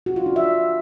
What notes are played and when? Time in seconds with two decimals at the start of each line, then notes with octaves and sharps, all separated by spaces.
0.06 F#4
0.16 F4
0.26 D4
0.36 E5